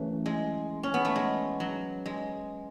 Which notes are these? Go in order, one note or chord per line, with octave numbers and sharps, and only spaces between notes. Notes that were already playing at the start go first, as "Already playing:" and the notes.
Already playing: F#2 C#3 E3 A3
G#3
C#4
B3
A3
G#3
F#3
G#3